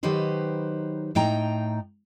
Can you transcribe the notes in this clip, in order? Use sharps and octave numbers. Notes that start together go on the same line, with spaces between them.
D#3 F#3 D#4 G4 B4 C5
A2 D#4 G5 A#5